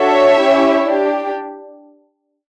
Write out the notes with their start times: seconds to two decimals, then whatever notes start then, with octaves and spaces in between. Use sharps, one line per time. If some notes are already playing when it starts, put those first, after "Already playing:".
Already playing: D4 F#4 A4 C#5 E5
0.38 C#4 E4 G4
0.85 D4 G4